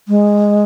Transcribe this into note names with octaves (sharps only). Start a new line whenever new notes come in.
G#3